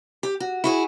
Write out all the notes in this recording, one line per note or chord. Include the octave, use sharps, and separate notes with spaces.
G4
F#4
E4 F#4 G#4